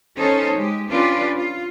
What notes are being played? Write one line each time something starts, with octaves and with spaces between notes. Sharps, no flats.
C#4 D#4 A4 C5 C#5
G#3 G4
C#4 D4 F4 G4 B4 D5
F4